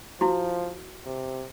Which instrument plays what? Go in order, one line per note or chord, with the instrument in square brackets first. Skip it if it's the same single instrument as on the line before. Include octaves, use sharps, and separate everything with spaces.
[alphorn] F3 [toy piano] E4 F#4
[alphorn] C3